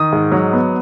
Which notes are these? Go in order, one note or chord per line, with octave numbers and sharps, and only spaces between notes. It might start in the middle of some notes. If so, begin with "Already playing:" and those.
Already playing: D#3 D#6
G#2
F#3
B3